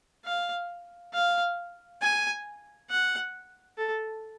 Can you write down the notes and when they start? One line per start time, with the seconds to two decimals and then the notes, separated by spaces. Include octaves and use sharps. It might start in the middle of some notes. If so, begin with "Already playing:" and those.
0.25 F5
1.13 F5
2.02 G#5
2.90 F#5
3.77 A4